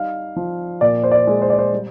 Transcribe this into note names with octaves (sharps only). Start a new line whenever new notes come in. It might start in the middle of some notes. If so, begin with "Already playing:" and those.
Already playing: G3 D#4 F5
F3
A#2 D5
C5
D5
G#3
C5
D5
C5
G3